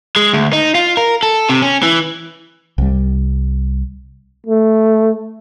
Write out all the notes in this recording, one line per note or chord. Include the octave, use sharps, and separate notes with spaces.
G#3
D2
D#4
F4
A#4
A4
C3
C#4
E3
C2 G3
A3